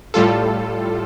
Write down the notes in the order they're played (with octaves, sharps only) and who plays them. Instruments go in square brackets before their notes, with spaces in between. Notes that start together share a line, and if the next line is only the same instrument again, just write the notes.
[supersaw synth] A2 G3 F4 A4